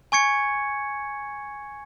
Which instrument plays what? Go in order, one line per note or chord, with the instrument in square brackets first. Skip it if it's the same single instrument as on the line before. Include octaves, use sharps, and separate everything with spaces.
[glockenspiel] G#5 C#6 G#6 C#7